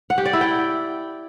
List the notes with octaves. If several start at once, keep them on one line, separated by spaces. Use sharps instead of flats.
F#5
G4
D5
E4
G5